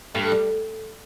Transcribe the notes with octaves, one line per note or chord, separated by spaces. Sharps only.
G2 A3
G3